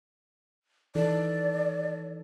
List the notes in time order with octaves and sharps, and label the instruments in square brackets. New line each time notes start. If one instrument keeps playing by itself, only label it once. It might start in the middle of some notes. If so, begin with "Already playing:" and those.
[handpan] E3 D#4 A4 [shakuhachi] D5